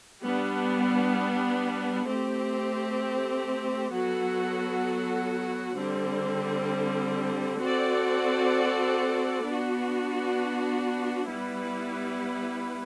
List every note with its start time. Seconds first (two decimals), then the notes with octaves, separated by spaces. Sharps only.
0.24 G3 B3 D4
2.08 A3 C4 G4
3.92 F#3 B3 F#4 A4
5.76 D3 G3 C4
7.61 C4 F#4 A4 D5
9.45 B3 D4 F#4
11.29 G3 B3 E4 B4